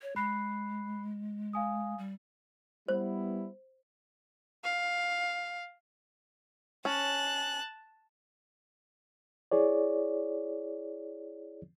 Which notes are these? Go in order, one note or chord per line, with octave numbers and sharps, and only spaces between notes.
C#5
G#3 B5 F#6 C7
F5 G#5 D#6
G3
G3 B3 E4 C5
F5
C#4 A5 F#6
E4 G#4 C#5 D5